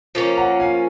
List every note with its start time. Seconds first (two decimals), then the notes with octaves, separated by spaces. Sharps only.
0.15 F3 A#3 C#4
0.37 F#5 A#5
0.60 F5 G#5